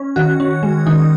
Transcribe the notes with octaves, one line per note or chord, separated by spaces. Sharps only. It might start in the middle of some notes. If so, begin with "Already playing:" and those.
Already playing: C#4
D#3 F#4
C#4
G#3
D#3 D#4